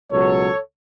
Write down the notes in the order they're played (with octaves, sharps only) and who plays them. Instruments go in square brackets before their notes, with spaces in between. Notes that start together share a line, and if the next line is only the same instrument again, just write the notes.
[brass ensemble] C#2 B2 F#3 A4 C#5